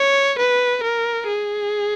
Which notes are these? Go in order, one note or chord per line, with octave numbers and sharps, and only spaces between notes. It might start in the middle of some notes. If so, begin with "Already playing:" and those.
Already playing: C#5
B4
A#4
G#4